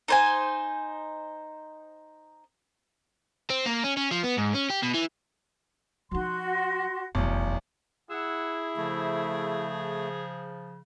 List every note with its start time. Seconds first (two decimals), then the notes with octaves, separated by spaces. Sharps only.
0.08 D#4 C5 G#5
3.50 C4
3.66 A#3
3.84 C#4
3.97 C#4
4.12 F3
4.24 B3
4.38 G#2
4.55 C#4
4.70 G4
4.83 B2
4.94 E3
6.11 F3 D#4 F#4 C6
7.15 F1 B1 E2
8.10 E4 G#4 F#5 E6
8.77 C#3 F3 A3